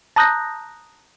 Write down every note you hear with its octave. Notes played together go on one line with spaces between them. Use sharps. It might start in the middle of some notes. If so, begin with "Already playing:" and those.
A5 A#5 D#6 F#6 G6 A#6